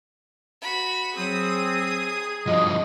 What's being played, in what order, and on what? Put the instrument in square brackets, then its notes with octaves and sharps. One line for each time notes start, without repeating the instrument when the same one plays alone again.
[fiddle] F#4 B5
[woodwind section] F#3 C4 [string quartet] G#4 [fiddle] D#6
[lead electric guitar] G2 F3 [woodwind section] D#5